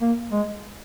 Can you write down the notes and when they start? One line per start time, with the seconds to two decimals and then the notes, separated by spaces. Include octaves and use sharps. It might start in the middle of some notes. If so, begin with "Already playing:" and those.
0.01 A#3
0.32 G#3